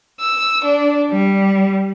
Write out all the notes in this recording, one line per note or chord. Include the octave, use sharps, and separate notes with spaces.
E6
D4
G3